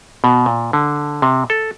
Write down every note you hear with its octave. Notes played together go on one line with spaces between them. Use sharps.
B2
A#2
D3
C3
A4